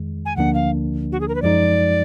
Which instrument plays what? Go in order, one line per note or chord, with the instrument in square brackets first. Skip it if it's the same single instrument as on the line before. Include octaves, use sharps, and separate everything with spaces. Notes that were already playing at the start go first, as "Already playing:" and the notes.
Already playing: [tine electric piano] F2 D#3 G#3
[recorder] G#5
[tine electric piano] D2 D3 F3 A#3 D4 [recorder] F#5
[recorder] F5
F#4
G#4
A#4
B4
[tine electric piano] F#2 F3 G#3 D#4 [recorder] D5